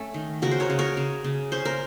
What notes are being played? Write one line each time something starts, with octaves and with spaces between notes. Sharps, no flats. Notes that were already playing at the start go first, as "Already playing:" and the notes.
Already playing: A3 C#4
D#3
C#3 F#4 A#4
C5
A#4 C#5
C#3
A#4 C#5
C#3
C#3
C#4 C5
A#4